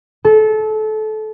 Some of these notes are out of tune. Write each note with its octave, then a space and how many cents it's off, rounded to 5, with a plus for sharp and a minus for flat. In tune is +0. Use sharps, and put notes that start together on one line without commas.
A4 -25